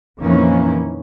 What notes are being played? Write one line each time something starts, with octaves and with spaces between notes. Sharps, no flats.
F2 A#2 D#3 E3 A#3 C#4